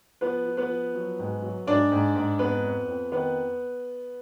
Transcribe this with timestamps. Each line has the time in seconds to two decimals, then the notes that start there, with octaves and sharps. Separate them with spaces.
0.21 F3 B3 B4
0.46 F3
0.57 B3 B4
0.70 F3
0.95 F#3
1.19 G#2
1.42 F#3
1.67 G#2 D4 D5
1.92 G#2
2.15 G#2
2.39 F2 B3 B4
2.64 F2
2.88 F2
3.12 D#3 B3 B4